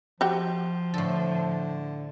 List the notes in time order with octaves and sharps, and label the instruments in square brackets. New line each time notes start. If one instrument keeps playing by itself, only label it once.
[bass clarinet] F3 [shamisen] F#4 G4
[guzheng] A2 A4 [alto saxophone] D3